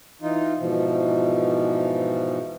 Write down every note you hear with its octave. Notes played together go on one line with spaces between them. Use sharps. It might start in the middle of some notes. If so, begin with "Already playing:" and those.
E3 D#4 F4
G#2 B2 E3 F3